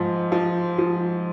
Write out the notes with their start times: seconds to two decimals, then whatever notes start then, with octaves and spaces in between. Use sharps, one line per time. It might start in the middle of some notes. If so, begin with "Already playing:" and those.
Already playing: G#2 F3
0.32 F3
0.78 F3